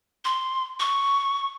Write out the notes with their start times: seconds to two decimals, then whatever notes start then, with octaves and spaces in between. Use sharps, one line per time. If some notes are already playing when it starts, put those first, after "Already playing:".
0.25 C6
0.80 C#6